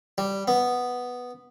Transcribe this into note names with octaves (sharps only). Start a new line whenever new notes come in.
G3
B3